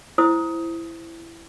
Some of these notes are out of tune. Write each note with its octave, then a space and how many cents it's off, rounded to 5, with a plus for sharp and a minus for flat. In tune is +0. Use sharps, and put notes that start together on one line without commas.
E4 +10 C5 +0 D#6 +15